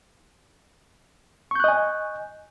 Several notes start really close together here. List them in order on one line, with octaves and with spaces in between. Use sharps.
C#6 G6 F#6 D#5 G#5